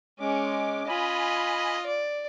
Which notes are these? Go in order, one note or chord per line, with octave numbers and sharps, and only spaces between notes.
G#3 C#4 D6
F4 D#5 G#5 B5
D5